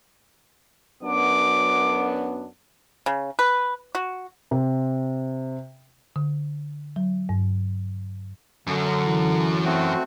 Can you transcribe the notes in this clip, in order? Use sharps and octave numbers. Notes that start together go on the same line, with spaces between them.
F#2 B3 D4 D6
C#3
B4
F#4
C3
D3
F#3
G2
F#2 D3 F#3
E3
A3 C4 F#4